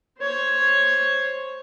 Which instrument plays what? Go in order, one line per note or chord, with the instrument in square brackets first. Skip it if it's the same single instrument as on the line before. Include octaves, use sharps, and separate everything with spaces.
[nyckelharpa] C5 C#5